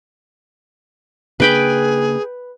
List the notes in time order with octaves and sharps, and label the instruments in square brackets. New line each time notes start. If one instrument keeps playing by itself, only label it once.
[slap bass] C#3 A#3 D4 [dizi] G#4 [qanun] B4 G5 B5